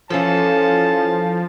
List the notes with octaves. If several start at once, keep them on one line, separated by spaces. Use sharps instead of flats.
E3 F3 C#4 A4 F5 A5